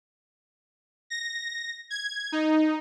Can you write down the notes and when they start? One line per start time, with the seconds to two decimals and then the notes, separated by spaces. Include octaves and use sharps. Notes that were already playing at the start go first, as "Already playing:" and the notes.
1.10 A#6
1.90 G#6
2.32 D#4